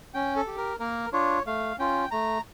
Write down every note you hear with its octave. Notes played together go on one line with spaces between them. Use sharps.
C#4 G5
A4
G4
A#4
A#3 A#4
D4 F4 C#5
A3 F5
C#4 F4 G5
A3 A#5